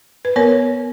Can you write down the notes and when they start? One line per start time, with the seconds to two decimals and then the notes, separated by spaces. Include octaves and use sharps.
0.25 B4
0.36 B3 A#4 C#5